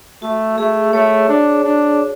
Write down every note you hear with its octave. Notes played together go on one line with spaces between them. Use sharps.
A3 F#4
A3 G#4
A3 C#5
D4
D4